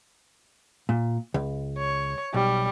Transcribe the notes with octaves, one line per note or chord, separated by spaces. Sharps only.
A#2
C#2
C#5
B1 G3